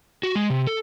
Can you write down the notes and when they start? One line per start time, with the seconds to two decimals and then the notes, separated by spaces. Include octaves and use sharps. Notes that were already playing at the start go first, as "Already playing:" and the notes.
0.23 F#4
0.35 G#3
0.50 C3
0.67 A4